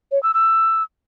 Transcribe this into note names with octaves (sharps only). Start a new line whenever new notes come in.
C#5
E6
E6